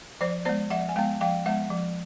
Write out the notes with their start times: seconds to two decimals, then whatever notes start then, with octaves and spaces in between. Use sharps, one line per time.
0.21 F3 C5 D5
0.45 G#3 B3 C5 D5
0.70 F3 E5 F#5
0.89 G#5
0.96 G#3 B3 F5 G5
1.21 F3 F5 G5
1.46 G#3 B3 E5 F#5
1.71 F3